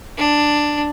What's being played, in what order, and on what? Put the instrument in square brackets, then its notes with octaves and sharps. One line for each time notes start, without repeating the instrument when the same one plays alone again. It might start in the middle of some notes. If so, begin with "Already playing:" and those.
[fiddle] D4